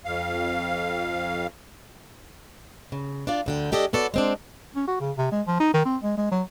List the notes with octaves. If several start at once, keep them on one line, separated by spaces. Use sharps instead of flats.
F2 F5
C#3
D4 F4 D5
D2 D3 G5
G#3 D4 G4 A4 D5 D#5
B3 F#4 A4 C#5 D5
G#3 C4 D4
C#4
F#4
C#3
C3
G#3
F3
D#4
D#3
C4
G#3
G#3
F#3